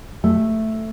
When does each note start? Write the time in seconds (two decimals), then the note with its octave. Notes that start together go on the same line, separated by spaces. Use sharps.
0.24 A3